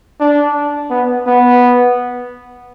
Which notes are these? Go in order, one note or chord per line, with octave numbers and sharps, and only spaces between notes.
D4
B3
B3